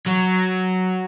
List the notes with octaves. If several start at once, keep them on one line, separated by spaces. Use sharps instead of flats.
F#3